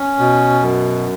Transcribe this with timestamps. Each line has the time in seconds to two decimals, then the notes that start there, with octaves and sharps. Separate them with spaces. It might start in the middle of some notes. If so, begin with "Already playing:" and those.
Already playing: C#4
0.19 B2
0.61 F#2